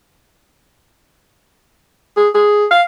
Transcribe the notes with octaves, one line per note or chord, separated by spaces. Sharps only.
G#4
G#4
F5